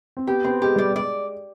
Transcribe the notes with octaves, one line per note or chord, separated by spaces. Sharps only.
C4
B3 G4
B3 C4
G#3 G4
G3 D5
G#3
D5